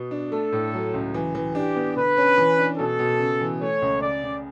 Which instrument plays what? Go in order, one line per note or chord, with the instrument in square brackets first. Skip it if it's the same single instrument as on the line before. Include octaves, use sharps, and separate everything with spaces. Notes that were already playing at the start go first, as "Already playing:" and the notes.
Already playing: [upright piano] B2 B3
D4
[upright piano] A3 [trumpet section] A4
[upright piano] A2
F#3
C#2
E3
E3
[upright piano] D4 [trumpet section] G4
[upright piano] B3
[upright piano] D3 [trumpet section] B4
[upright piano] C#4
E3
D4
[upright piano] B2 [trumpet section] A4
[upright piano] B2
C#3
E3
[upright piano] A3 [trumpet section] C#5
[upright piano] C#2
[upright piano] C#3 [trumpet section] D5
[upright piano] C#3